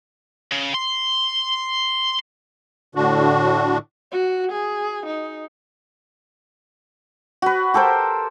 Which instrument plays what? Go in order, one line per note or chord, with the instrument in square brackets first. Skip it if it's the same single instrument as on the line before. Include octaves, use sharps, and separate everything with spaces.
[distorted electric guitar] C#3
C6
[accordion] A2 D3 D4 F#4
[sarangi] F#4
G#4
D#4
[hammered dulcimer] F#4 B4
G4 A4 A#4 C5